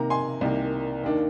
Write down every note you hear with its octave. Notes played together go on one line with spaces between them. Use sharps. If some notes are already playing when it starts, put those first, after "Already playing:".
Already playing: C3 D#3 A#3 A#5
G#5 C6
C2 C3 D#3 A#3
D#2 D#3 A#3 D4